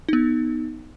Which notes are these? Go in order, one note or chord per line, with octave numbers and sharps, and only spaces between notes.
B3 D#4